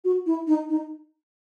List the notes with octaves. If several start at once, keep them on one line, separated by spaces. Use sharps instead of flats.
F#4
E4
D#4
D#4